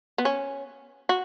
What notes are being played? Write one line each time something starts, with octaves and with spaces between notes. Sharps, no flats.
B3
C#4
F#4